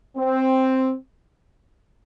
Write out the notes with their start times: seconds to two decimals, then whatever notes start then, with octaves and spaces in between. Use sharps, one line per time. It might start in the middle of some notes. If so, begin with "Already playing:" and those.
0.17 C4